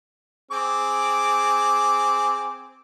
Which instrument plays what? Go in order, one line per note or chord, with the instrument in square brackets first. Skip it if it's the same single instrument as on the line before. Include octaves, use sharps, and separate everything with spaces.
[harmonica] C4 G#4 D6